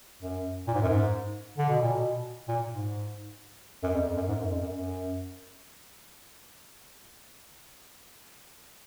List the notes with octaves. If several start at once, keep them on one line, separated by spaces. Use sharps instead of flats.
F#2
A#2
G#2
F#2
G#2
D3
B2
A#2
B2
A#2
G#2
F#2
F2
F2
F#2
G#2
F#2
F2
F#2
F#2